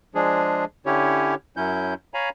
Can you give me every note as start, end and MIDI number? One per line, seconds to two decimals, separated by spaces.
0.15 0.65 53
0.15 0.65 56
0.15 0.65 62
0.15 0.65 68
0.86 1.35 50
0.86 1.35 61
0.86 1.35 64
0.86 1.35 67
0.86 1.35 73
1.57 1.94 42
1.57 1.94 54
1.57 1.94 61
1.57 1.94 64
1.57 1.94 91
2.14 2.29 73
2.14 2.29 77
2.14 2.29 80
2.14 2.29 82
2.14 2.29 83